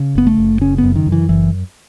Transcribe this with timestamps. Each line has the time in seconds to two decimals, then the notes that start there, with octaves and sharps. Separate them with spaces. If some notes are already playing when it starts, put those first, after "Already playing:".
Already playing: C#3
0.15 F#1 B3
0.27 A3
0.38 F#1
0.61 C#3 C#4
0.78 B3
0.84 F#2
0.96 D#3
1.06 F#2
1.12 E3
1.29 F#1 E3